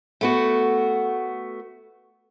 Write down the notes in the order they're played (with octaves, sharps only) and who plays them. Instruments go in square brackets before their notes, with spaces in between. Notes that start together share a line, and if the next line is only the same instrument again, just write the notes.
[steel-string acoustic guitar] A3 B3 F#4